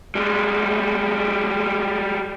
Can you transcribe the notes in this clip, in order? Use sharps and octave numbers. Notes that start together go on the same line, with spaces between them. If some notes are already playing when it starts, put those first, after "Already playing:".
G3 G#3